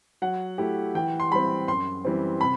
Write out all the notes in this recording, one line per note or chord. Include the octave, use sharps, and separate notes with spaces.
F#3 F#5
A3 E4 G4
E3 G5
C6
G3 C4 B5
F#2 C6
E3 G3 C4
C3 B5